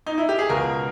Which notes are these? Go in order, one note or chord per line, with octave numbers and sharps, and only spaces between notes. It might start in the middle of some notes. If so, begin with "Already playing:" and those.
D#4
E4
G4
G#4
C#2 B2 A#4